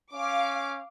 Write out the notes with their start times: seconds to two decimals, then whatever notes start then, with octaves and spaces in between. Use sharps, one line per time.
0.13 C#4 F5 D6